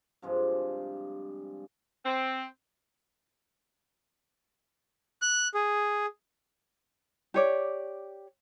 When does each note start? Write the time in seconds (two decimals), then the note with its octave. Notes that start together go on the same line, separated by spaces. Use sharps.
0.22 G2 C3 F3 G#3
2.05 C4
5.22 F#6
5.54 G#4
7.34 G4 C#5 D5